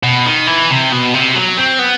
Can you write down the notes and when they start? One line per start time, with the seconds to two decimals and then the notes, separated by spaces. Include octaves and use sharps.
0.03 B2
0.26 D#3
0.47 E3
0.70 C3
0.92 B2
1.14 C3
1.35 F#3
1.58 C4
1.79 B3